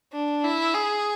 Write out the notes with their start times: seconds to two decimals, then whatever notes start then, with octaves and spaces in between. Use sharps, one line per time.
0.13 D4
0.44 E4
0.74 G#4